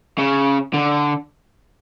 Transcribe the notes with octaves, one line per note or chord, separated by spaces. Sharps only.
C#3
D3